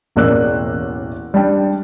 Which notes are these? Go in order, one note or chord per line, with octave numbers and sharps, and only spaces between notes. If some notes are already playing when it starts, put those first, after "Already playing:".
E1 A1 A#3 D5 E6 F#6
G3 D4 G5